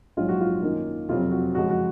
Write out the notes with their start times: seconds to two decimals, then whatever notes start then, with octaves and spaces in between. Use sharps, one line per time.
0.17 A#1 G#2 F#3 F4
0.29 F#4
0.41 F4
0.62 F#2 D#3 A#3
1.09 F2 C3 F#3 C4 F4
1.32 F#4
1.55 F#2 C#3 F3 G#3 F#4
1.70 F#4